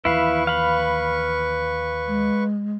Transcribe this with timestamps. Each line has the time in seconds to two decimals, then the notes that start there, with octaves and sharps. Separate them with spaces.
0.05 D#2 E3 F3 E4 B4 F5 C#6
0.47 F5 B5
2.08 G#3